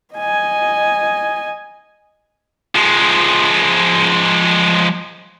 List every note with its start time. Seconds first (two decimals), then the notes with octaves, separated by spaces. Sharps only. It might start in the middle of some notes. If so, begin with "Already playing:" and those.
0.14 D#5 G#5
2.75 F3 G#3